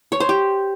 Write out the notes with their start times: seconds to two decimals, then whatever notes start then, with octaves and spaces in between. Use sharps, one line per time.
0.12 C#5
0.20 C5
0.29 G4